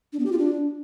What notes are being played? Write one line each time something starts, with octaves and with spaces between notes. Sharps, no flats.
D4
B3
G4
F4
D4